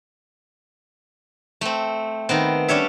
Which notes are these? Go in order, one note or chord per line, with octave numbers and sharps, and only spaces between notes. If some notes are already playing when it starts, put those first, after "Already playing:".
A3 C4
D#3 B3 C4
G3 C#4 D4 C#5 E5